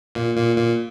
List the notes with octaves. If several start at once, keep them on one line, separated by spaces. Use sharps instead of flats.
A#2
A#2
A#2